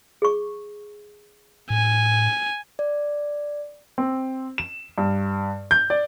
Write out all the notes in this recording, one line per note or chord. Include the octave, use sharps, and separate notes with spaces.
G#4 C#6
A2 G#5
D5
C4
E7
G2
G6
D5